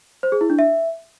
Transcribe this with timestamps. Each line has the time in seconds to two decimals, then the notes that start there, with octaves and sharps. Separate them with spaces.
0.23 C5
0.32 G#4
0.41 E4
0.50 D4
0.59 E5